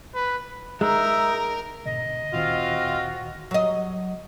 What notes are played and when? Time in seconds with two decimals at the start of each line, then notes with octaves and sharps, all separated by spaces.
0.15 B4
0.81 G#3 D#4 A#4 E5
1.85 G#2 B2 D3 D#5
2.33 D2 A#2 D#3 C4 F4 F#4
3.51 F#3 D#5